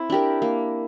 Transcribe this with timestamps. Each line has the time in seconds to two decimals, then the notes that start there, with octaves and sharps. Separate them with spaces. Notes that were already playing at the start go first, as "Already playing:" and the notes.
Already playing: C4 E4
0.10 D4 G4 A#4
0.42 A#3